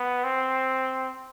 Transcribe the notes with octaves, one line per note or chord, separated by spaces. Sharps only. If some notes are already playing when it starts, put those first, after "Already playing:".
Already playing: B3
C4